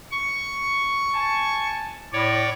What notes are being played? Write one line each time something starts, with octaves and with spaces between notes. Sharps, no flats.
C#6
G#5 A5
A2 C#5 D5